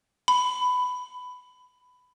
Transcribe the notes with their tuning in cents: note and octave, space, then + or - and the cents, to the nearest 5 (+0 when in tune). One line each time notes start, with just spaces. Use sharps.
B5 +15